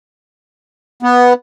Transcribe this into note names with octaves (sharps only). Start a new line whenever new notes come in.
B3